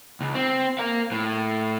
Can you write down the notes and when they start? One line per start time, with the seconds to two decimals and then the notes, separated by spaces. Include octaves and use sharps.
0.21 C#2
0.35 C4
0.79 A#4 F5
1.12 A2